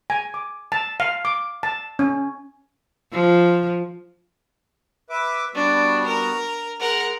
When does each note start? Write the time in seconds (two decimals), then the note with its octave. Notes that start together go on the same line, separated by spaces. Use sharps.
0.10 G#5
0.34 D6
0.72 A5
1.00 F5
1.25 D6
1.63 A5
1.99 C#4
3.12 F3
5.10 B4 E5 D6
5.55 G3 B3 D4 F#4
6.06 A#4
6.80 G#3 A#4 F#5